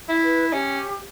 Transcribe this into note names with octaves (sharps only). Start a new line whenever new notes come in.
E4
B4
C#4 G4